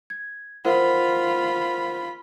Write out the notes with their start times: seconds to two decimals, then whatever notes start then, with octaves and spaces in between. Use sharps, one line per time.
0.10 G#6
0.65 F4 A#4 C5 F#5 B5